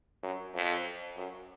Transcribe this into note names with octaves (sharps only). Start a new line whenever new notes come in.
F#2
F2
F#2